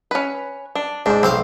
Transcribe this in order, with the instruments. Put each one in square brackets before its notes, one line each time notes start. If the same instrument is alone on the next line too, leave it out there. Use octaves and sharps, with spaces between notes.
[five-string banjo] C#4 B4
D4
[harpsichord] G#2 [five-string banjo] D4 C5
[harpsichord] B1 C5 F5 [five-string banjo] C4